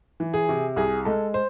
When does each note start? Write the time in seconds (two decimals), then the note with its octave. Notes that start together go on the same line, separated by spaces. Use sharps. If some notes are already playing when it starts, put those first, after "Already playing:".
0.20 E3
0.34 G#4
0.49 C3
0.76 C2 G#4
1.05 G#3 A4
1.34 C5